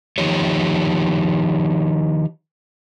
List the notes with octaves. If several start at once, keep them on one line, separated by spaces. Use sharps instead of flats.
D#3 F3 D#4 G4 C#5